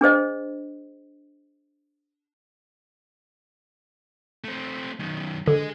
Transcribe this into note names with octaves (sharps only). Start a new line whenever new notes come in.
D4 G#4 C5 D#5
A3 C4
F#2 D#3
D3 G#4 D#5